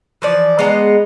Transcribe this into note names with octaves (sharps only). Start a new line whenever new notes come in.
E3 F3 D5
G#3 B3 D#5 A#5